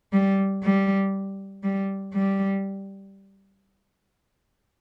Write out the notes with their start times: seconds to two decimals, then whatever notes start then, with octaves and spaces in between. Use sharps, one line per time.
0.12 G3
0.62 G3
1.63 G3
2.14 G3